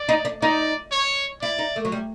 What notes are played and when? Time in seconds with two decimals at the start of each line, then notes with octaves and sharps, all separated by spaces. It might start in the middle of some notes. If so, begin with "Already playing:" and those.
Already playing: D5
0.09 D#4
0.25 D4
0.41 D#4 D5
0.92 C#5
1.42 E4 D5
1.59 D#4
1.76 A3
1.85 F#3
1.92 G3